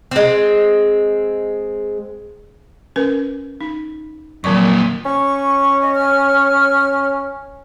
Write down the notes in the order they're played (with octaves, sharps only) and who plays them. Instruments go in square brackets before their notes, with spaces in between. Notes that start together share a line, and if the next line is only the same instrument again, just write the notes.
[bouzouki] G#3 C4
[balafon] C#4 A#4 B4
D#4
[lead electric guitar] F2 A#2 [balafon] D#3 F#3 C#6
[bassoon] C#4 [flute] C#6
[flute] D#5
F6